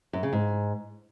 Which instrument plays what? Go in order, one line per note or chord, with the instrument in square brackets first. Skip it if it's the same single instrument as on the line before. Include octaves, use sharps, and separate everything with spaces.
[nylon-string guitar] F#2
C#3
G#2